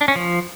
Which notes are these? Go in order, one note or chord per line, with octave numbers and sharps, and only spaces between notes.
D4
C#4
F3